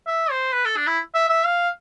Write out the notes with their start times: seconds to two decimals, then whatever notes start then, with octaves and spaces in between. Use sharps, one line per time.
0.07 E5
0.31 C5
0.53 B4
0.65 A4
0.77 D4
0.87 E4
1.15 E5
1.29 E5
1.45 F5